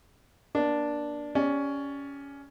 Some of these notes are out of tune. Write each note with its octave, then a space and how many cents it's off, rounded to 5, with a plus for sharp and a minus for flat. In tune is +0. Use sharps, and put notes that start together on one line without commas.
A#3 +35 D4 +0
C#4 +15 G4 +30 D5 +0